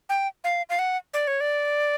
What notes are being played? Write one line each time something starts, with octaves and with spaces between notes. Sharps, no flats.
G5
F5
F5
F#5
D5
C#5
D5